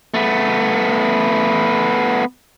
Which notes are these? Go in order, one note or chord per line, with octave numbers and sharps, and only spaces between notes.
A3 B3